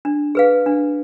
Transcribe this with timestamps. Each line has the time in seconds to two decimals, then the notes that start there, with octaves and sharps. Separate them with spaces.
0.05 D4
0.35 G#4 B4 F5
0.66 D4